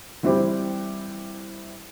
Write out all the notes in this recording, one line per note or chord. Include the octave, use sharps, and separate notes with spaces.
E3 G3 C4 E4 G4 C5